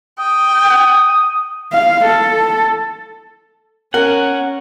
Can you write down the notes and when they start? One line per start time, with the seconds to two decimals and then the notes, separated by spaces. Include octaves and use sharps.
0.19 G5 D#6
1.73 F5
2.05 A4
3.94 C#4 A#4 F#5